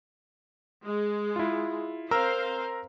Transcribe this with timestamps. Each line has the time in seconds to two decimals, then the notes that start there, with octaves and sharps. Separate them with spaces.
0.85 G#3
1.36 E4 F4
2.11 C4 A#4 C5 F5 A#5 E6